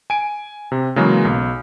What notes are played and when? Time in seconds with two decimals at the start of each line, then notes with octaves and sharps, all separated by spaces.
0.10 G#5 D7
0.72 C3
0.96 C#3 E3 F#3 G#3 A#3
1.25 B1